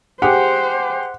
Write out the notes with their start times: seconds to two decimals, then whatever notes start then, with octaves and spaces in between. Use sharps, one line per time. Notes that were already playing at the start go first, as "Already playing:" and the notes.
0.22 G4 G#4 C5 F#5